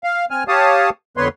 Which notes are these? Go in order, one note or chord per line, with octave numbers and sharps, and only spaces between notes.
F5
C4 G#5 F6
G4 C#5 F5 A5 D#6
F2 D3 B3 B4 C#5 C6